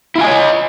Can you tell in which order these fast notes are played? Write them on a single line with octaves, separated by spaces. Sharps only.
E4 F4 G#5 D#5 C#5